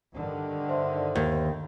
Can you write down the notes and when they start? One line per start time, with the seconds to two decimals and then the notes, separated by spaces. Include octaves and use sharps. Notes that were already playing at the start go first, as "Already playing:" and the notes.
0.14 G2 D3 D#3
0.69 C5 E5 C6
1.16 D#2